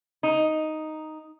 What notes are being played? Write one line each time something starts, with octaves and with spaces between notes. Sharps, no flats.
D#4